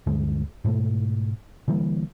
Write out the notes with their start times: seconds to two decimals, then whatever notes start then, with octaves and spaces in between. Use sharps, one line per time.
0.06 D2 G2 D3 G#3
0.65 G#2 B2 A3
1.68 D3 E3 G3 A#3